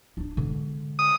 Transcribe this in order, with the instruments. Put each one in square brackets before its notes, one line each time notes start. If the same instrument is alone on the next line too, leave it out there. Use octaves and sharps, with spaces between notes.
[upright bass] D4 D#4
D3 G#3
[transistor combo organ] D#6